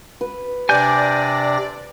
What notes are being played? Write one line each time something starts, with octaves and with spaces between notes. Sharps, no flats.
B4
C3 D4 D5 G#5 G6 A#6